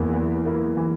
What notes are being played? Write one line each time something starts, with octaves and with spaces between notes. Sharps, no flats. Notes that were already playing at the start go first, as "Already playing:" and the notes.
Already playing: E2 E3 A#3 E4
E3
A#3 E4
E3